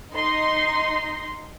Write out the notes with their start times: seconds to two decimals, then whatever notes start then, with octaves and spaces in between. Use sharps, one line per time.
0.14 D#4 C6